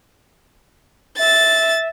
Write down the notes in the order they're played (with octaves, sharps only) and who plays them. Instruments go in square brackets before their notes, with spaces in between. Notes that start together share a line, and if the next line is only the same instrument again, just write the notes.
[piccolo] E5 [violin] A6